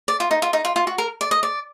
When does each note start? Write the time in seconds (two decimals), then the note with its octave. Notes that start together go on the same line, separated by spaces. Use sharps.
0.08 D5
0.20 F4
0.31 D#4
0.42 F4
0.53 D#4
0.65 F4
0.76 F4
0.87 F#4
0.98 A#4
1.21 D5
1.31 D#5
1.43 D5